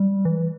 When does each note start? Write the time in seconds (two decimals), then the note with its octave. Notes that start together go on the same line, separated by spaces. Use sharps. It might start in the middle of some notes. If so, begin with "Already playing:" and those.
Already playing: G3
0.25 E3